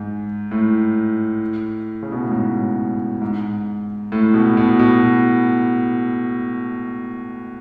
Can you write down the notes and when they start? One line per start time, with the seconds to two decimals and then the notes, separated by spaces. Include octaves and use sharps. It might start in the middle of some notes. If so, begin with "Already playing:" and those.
Already playing: G#2
0.51 A2
2.03 C#3
2.12 B2
2.22 A2
2.31 G#2
3.22 G#2
4.12 A2
4.34 B2
4.57 B2
4.79 B2